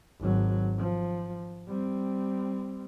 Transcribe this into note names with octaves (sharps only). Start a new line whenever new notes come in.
G#1 F#3
F3
G3 C4